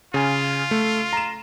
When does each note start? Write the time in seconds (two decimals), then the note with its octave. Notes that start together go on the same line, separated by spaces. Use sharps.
0.14 C#3 F4 G#5
0.71 A3
1.13 A#5 E7